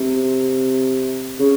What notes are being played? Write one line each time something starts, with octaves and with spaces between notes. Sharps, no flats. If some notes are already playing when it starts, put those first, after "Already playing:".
Already playing: C3
C#3